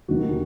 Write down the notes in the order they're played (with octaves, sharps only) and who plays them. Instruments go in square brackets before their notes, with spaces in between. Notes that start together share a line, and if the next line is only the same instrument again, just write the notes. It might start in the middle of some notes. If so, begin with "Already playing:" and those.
[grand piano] D#2 D#3 A#3 F#4